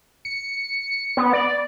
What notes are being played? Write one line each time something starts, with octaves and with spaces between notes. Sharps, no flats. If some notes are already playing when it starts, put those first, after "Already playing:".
C#7
B3
D5